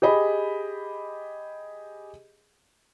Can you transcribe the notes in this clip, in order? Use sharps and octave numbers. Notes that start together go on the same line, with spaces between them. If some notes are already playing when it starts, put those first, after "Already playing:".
G4 G#4 D#5 B5